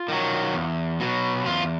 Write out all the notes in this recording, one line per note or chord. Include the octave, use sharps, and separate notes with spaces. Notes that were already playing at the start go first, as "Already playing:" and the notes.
Already playing: F4
D#3 F#3
E2
B2 F#3
E2 F4